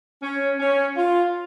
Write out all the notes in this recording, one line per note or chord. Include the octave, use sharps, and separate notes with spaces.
C#4
C#4
F4